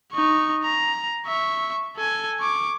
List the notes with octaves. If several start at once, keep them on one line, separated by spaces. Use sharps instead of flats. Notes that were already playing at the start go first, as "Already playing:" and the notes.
D#4 C#6
A#5
E5 C#6
A4 G#5
C#6 D6